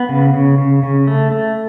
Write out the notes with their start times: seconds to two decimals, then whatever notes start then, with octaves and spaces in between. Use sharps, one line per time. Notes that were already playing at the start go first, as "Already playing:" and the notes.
Already playing: B3
0.09 C#3
0.34 C#3
0.58 C#3
0.83 C#3
1.07 A3
1.32 A3